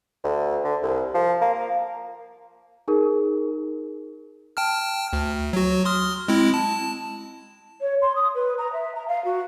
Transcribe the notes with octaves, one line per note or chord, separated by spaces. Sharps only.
D2
D3
C2
F3
A#3
A#3
D#4 G#4 A#4
G5 A5 F6
D2
F#3 F#4
C6 D#6 F6
G#3 C4 E4
A5
C#5
C6
D#6
B4
A#5
E5
A#5
F5
F#4